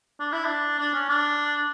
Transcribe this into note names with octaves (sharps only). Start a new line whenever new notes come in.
D4
E4
D4
D4
C#4
D4